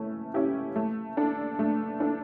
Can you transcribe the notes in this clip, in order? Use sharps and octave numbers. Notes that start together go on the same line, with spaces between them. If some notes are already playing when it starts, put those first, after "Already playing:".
Already playing: A3 C#4 E4
C#4 E4 G4
A3
D4 A4
A3
D4 A4